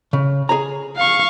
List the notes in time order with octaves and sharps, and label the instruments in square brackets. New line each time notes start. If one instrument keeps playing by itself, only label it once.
[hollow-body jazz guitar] C#3
G#4 C#5 A#5
[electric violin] F5 C#6